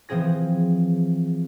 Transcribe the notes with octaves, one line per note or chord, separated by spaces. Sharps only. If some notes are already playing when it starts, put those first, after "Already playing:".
E3 F3 C4 G#4 A#6